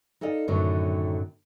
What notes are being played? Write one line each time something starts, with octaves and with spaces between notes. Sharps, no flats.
D#4 A4 D5 D#5 F5
F#2 A2 D3 D#3 F#3